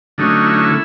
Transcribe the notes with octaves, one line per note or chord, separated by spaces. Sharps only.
D3 F#3 A3 C#4 D#4
E4
D#4
E4